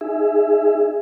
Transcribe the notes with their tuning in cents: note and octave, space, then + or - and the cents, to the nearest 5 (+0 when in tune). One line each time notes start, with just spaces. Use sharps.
D#4 +0 G#4 +0 E5 +15